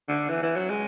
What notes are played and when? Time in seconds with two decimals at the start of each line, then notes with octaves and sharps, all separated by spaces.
0.09 D3
0.29 E3
0.43 E3
0.56 F#3
0.70 G#3